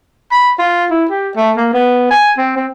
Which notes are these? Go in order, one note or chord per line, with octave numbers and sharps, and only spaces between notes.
B5
F4
E4
G4
A3
A#3
B3
G#5
C4
C4